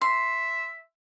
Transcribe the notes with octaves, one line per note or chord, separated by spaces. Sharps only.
E5 C6